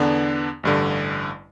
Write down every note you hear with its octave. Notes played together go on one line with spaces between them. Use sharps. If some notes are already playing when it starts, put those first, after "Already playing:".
Already playing: E2 D3 B3 D4
A1 G2 D3